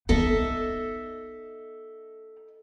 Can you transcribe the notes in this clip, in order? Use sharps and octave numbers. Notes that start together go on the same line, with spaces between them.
B3 D#4 A4 D#5 E5